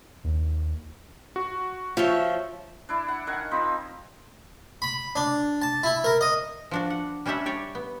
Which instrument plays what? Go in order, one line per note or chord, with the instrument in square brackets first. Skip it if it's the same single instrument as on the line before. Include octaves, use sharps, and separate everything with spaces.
[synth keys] D#2
[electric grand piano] F#4
[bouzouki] F3 C#5 G5 [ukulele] F4 [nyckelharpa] E5
[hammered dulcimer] D4 E4
F#5
D#3 F5 F#5 G#5
F3 C4 D#4 B5
[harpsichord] B5
D4
A5
E4
A#4
D#5
[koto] F3 D4 F#4
F#5
G3 C#4 D4 G4 E5 F#5
G4 C#5 D5
B3